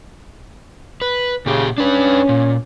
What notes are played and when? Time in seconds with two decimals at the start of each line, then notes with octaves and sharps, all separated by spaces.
1.02 B4
1.46 A#2 C#3 G4
1.78 C#4 D4 B4
2.29 A#2